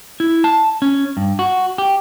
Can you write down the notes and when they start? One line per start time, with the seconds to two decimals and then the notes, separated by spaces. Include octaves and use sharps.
0.20 E4
0.44 A5
0.82 C#4
1.17 G2
1.39 F#4
1.78 G4